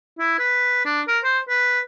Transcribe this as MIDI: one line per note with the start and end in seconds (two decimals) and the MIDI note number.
0.19 0.36 64
0.39 0.81 71
0.85 1.01 62
1.08 1.19 70
1.24 1.39 72
1.49 1.80 71